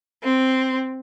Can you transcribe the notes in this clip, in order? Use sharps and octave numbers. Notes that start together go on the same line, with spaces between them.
C4